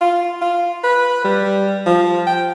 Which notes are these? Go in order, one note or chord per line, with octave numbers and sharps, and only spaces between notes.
F4
F4
B4
G3
F3
G5